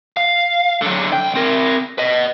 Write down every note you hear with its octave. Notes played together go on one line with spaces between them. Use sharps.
F5
D3 F#3
C2 G5
C4 A#4
B4 D#5